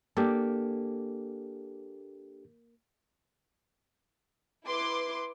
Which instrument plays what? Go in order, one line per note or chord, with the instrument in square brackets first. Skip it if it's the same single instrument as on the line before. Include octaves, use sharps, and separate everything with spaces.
[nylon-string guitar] A#3 [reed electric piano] D4 G4 A4
[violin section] E4 B4 C6 D6